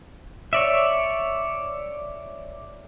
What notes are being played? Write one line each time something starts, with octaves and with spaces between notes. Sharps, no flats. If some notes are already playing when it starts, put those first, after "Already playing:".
C#5 D5 E5